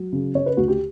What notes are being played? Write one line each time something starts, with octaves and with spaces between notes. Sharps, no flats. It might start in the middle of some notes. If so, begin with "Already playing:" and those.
Already playing: F#3
C#3
C#3 C#5
B4
D2 F#4
G4